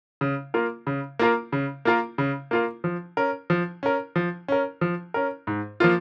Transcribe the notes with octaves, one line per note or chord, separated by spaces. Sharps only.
C#3
A#3 F4 A#4
C#3
A#3 F4 A#4
C#3
A#3 F4 A#4
C#3
A#3 F4 A#4
F3
C#4 A#4
F3
C#4 A#4
F3
C#4 A#4
F3
C#4 A#4
G#2
F3 A#3 F4